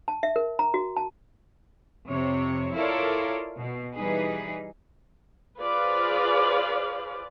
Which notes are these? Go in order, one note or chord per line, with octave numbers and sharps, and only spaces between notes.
A5
E5
A#4
A#5
F#4
A5
F2 C3 C#5
E4 F4 A4 A#4 C#5 D5
B2
E3 G3 D#4 G#4 B4
F4 G#4 B4 C5 D5 F5